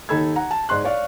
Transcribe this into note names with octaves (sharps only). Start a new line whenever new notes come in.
D#2 D#4 A4 B5 E6 G#6
F#5 A#5
A5
G#2 D5 C6 F#6
C#5 D5 F5